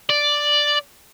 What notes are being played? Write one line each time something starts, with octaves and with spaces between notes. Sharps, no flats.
D5